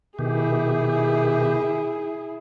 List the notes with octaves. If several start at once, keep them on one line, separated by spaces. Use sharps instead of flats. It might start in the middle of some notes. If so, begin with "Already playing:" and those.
B2 D#3 E4 G4 G#4